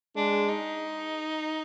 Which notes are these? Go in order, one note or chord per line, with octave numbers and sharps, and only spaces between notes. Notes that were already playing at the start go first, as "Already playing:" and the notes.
G#3 D4
D#4